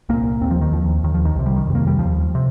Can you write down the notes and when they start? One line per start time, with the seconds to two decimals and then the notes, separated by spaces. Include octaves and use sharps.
0.09 C2 A#2 A#3
0.41 D#2 C4
0.51 F3
0.61 D#3
0.72 D#2 F3
1.04 D#2 D#3
1.14 F3
1.25 D#3
1.36 C2 C3
1.46 G3
1.56 D#3
1.67 F2 C3
1.75 A#3
1.87 G3
1.99 D#2 F3
2.35 C3